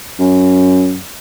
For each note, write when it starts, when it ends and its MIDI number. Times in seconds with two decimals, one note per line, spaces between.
0.20 0.98 42